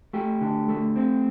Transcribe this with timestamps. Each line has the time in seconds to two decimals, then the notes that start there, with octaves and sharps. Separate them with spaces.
0.13 A3 G4
0.41 D3
0.69 A3
0.96 C4